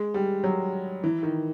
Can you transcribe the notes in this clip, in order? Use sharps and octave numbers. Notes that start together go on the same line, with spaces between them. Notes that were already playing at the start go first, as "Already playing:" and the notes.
Already playing: G#3
G3
F#3
E3
D#3